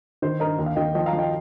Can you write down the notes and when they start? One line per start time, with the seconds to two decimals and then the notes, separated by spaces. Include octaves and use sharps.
0.22 D#3 C5
0.40 G2 A#4 D#5
0.59 D#2
0.66 F5
0.76 D#3 D#5 G5
0.94 F3 D#5 G5
1.06 F5 A#5
1.13 F3
1.18 D#5 G5